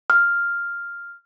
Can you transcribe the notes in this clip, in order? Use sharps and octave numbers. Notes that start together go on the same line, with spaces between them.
F6